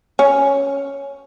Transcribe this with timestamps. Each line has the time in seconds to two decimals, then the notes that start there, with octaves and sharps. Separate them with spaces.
0.19 C#4